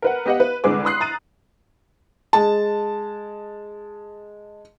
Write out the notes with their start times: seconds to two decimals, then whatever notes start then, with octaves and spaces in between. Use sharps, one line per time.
0.02 A#4 B4 F#5
0.26 B3 G4 D#5 F5 F#5
0.40 B4
0.64 C2 D3 G#3 G#4 B4 D6
0.85 B5 C6 D#6 F#6 C7
1.00 A#5 A6 D#7
2.33 G#3 A5